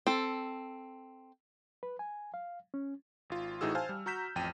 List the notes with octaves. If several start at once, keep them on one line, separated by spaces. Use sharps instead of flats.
C4 A4
B4
G#5
F5
C#4
G#1 F4
A2 E3 D#4 F#4 G#4 E6
C5 F5 G#5 A5 F6
G3
F#4 A#5 G6 B6 E7
A1 F2 G5 D#7